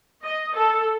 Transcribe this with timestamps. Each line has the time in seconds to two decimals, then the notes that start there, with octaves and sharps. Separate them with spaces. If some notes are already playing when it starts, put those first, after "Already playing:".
0.22 D#5
0.53 A4